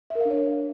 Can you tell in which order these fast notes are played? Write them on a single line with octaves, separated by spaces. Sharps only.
E5 A#4 F5 D4 C#5